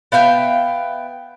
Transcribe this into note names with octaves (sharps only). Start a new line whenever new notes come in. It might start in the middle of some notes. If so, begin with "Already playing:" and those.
B3 E5 F5 G5